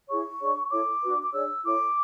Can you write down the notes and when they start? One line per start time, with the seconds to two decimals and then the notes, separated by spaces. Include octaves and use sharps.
0.09 E4 G#4 C#5 C#6
0.39 D4 G#4 C#5
0.70 E4 A4 C#5 D6
1.02 D4 F#4 B4
1.22 D6
1.33 D4 G#4 C#5 E6
1.64 E4 A4 C#5 D6